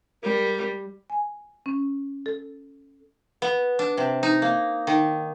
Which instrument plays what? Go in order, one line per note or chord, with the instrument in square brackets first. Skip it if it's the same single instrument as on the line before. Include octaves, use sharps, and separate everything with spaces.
[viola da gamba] G3 [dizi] A#4
[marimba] G#5
C#4
A4
[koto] B3
D4
C3
D#4
A#3
D#3